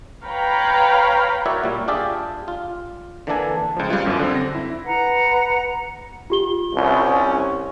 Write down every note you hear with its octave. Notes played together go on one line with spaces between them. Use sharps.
B4 C#5 F5 G5 A#5 B5
E4 F#4 A#4 C#5 D5 E5
A#2 G3
D4 F4 G4 G#4 D5 E5
F4
D3 E3 A#3 D4 A4 G#5
C#2 F3
G3 F4
G1 F#2
D3 C4
A#6
E4
B4 F#5 A#5
F4 G4 G7
C2 C#4